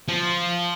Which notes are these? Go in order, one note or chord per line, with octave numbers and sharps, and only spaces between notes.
F3